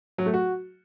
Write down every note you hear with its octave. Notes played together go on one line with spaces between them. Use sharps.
F#3
A3
F#4